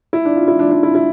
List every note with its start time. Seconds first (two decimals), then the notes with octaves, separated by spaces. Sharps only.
0.13 E4
0.25 D4
0.36 F4
0.48 E4
0.59 D4
0.71 D4
0.83 E4
0.95 E4